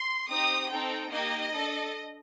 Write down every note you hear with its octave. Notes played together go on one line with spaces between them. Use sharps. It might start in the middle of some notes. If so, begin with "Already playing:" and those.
Already playing: C6
C4 D#4 G4 D#6
C4 D#4 A4 G5
A#3 D#4 G4 D#5
D4 A4